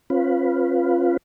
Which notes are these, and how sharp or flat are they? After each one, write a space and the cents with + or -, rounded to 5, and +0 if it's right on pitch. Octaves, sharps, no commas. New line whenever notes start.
C#4 -45 F4 +0 B4 +0